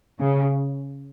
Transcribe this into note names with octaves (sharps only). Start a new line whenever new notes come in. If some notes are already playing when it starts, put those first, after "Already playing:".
C#3